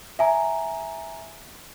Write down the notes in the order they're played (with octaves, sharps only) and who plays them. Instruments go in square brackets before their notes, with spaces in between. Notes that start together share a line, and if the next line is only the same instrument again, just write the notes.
[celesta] E5 G#5 A#5